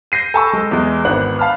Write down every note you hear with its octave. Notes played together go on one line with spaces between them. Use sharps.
G6 A#6 C7 D#7
A4 G#5 A5 B5 C#6 E6
G#3 A4
E2 G#3
G#1 B3 D4 F#5 F#6 F#7
F5 A5 B5 F6